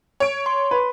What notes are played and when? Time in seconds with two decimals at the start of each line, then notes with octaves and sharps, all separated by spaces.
0.20 C#5 D7
0.46 C6
0.71 B4